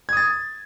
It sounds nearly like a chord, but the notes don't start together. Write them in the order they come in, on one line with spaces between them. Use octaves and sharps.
G#6 D#6 A6